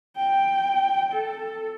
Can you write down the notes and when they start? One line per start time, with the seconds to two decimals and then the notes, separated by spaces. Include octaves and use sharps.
0.17 G5
1.13 A4